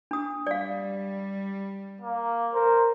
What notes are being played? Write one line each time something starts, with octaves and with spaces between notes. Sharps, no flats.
D4 D#6
G3 D5 F5
A#3
A#4 C5